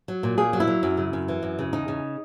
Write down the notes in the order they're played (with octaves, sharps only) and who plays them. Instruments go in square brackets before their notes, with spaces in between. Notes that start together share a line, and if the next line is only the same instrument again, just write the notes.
[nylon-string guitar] F#3
A#2
A#2 G#4
F#3
E4
F#3
F#2
C#3
F#2
E3
F#2
C#3
E2 D#4
C#3